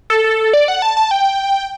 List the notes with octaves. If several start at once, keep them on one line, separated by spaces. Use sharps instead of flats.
A4
A4
D5
F#5
A5
A5
G5